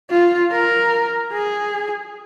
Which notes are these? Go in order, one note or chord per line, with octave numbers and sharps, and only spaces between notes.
F4
A#4
G#4